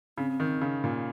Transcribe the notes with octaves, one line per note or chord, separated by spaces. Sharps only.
C#3 C4
D#3
C#3
A#2